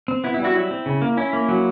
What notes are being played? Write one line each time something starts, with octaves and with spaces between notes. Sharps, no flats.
C4
B3 E4
E4
G3
E4 F#4
F#3 E4
C4
C#3
A#3
C#4 E4
A#3
F#3